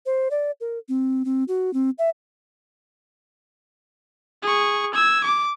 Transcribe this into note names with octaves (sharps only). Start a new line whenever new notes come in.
C5
D5
A#4
C4
C4
F#4
C4
E5
G#4 C#6
E6 G#6
D6